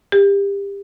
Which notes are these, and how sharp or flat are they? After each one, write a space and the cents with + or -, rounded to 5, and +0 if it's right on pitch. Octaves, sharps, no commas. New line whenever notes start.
G4 +30